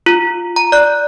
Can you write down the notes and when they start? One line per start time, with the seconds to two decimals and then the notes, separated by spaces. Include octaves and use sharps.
0.06 F4
0.56 A#5
0.72 D5 F#6